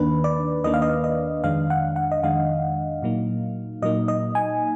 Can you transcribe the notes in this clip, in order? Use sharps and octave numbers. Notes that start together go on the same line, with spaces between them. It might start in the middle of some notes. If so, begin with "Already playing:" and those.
Already playing: D#2 D#3 A#3 D4 B4
D5
D#2 D#3 A#3 D4 D#5
F5
D#5
D#5
F2 D#3 G#3 D4 F5
F#5
F#5
D#5
F2 D#3 G#3 D4 F5
A#2 F#3 A#3 D#4
A#2 F#3 A#3 D#4 D#5
D#5
G#5